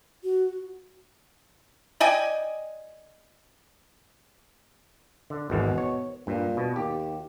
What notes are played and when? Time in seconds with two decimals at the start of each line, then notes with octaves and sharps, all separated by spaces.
0.23 F#4
2.00 D5 D#5 G5 G#5
5.30 D3
5.50 G#1 E2 G#2 B2
5.78 C#5
6.27 G2 A#2
6.57 B2
6.76 D#2 G4